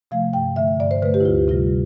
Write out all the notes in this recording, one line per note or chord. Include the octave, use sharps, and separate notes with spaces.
C3 F3 A3 F5
G2 G5
D3 A3 E5
G2 D5
C5
D3 A3 B4
G4
E4
D2 F4
C3 G3 F4